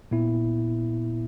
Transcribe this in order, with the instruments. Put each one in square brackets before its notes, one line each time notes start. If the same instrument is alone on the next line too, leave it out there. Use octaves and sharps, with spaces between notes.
[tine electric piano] A#2 B3 E4